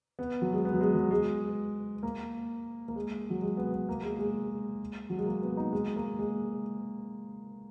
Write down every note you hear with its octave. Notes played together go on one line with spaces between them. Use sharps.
B3
F#3
G#3
B3
F#3
G#3
F#3
G#3
A#3
A#3
G#3
F#3
G#3
B3
B3
A#3
G#3
G#3
F#3
G#3
A#3
B3
D#4
G#3
A#3
G#3